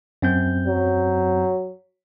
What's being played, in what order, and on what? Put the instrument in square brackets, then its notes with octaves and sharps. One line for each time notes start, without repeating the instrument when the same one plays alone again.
[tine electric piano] F#2 C4 G6
[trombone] F#3